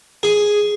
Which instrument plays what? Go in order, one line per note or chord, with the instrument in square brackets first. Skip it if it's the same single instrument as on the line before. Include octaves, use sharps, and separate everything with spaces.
[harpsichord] G#4